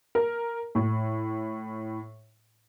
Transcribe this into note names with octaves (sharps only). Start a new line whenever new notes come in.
A#4
A2